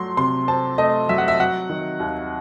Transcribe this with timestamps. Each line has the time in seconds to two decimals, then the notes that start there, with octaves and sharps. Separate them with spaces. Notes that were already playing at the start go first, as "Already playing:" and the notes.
Already playing: F#3 A3 C6
0.17 C3 C6
0.48 C4 A5
0.78 A3 D#5
1.09 F#3 E5
1.18 F#5
1.28 E5
1.39 F#3 F#5
1.70 D#3
2.00 D#2